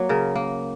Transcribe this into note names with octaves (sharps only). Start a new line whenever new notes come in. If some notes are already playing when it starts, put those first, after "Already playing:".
Already playing: F#3 A#3
C#3 A#4
A#3